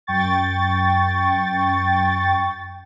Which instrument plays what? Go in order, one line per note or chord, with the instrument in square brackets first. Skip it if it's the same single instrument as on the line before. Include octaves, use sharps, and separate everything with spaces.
[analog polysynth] F#2 G5 C#6 A6